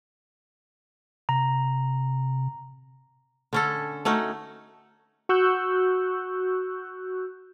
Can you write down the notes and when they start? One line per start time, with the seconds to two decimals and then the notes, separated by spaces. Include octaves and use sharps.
1.29 C3 A#5
3.53 D3 C#4 A4
4.05 A3 C#4 D#4 F#4
5.29 F#4 C#6 E6 F#6 G6